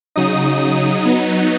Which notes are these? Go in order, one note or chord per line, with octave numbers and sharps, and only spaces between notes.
C#3 F#3 D#4 D#6
F#3 B3 D#4